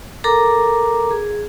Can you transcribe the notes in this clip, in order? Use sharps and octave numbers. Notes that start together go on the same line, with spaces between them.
A4 A#4 A#5 D6
G#4